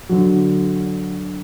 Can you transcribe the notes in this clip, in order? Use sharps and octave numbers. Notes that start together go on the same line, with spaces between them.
D3 F#3